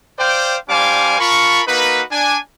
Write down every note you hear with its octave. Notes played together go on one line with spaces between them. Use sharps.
C5 D5 F5 G5
G3 D4 C5 F5 G#5 D6
F4 A#4 A5 B5 C#6
A#3 D#4 F#4 B4
D4 G#5